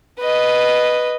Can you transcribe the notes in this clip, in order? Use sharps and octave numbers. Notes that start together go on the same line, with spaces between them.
B4 D#5